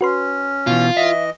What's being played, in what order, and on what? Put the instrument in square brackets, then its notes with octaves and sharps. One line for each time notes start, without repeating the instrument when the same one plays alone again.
[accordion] C#4 [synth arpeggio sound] F#4 B4 C6
[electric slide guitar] B2 E3 [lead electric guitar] F4
[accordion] E3 D#5 [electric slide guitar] E5